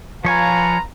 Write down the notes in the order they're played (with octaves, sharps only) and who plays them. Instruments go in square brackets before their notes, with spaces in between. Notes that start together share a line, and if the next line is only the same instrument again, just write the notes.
[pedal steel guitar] F3 C#5 G#5 [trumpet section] F4 B4 A#5